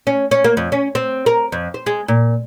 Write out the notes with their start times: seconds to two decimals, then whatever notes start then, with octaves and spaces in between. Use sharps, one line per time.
0.07 C#4
0.31 C#4
0.44 A#3
0.57 F2
0.72 C#4
0.95 C4
1.26 A#4
1.52 F2
1.74 C5
1.86 G#3
2.08 A#2